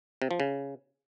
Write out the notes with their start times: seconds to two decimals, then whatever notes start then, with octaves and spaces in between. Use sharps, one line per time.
0.22 C3
0.31 F3
0.40 C#3